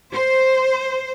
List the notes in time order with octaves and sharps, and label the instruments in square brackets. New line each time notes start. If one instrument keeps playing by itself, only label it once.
[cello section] C5